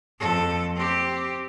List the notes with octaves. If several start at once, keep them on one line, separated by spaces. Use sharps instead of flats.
F2 A4
C4 G4